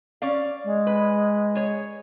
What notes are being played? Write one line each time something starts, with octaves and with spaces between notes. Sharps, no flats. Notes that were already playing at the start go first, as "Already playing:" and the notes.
C#4 D5 F5
G#3
B4
G#4 C#5